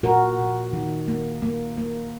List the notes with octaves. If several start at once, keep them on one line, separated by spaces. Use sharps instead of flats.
A#2 F#4 A#4
A#2
D#3
A#3
A#3
A#3